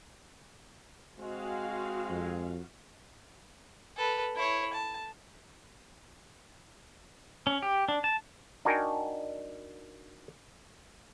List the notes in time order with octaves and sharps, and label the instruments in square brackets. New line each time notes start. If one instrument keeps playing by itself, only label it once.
[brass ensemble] G#3 C4 [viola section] F#4 F5
[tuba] F2
[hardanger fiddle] A4 B4
E4 C#5
A5
[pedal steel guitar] C#4
G4
D4
A5
[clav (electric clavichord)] D4 D#4 F#4 A#4 G5 G#5